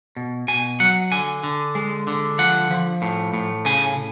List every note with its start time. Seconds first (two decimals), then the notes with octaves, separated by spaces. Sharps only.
0.17 B2
0.48 B2 G#5
0.80 F#3 F#5
1.12 D3 G#5
1.44 D3
1.75 G#3
2.07 D3
2.39 F3 F#5
2.71 F3
3.02 A2
3.34 A2
3.65 C#3 G#5